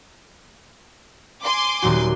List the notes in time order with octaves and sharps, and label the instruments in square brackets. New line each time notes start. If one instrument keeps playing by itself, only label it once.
[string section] G#5 C6 D6
[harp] D#1 F#3 F#4